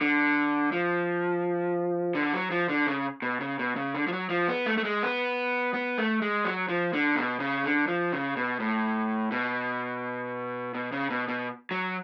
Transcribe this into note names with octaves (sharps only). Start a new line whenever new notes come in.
D3
F3
D3
F#3
F3
D3
C#3
B2
C#3
B2
C#3
D3
F3
F#3
F3
B3
A3
A3
G#3
B3
B3
A3
G#3
F#3
F3
D3
B2
C#3
D3
F3
C#3
B2
A2
B2
B2
C#3
B2
B2
F#3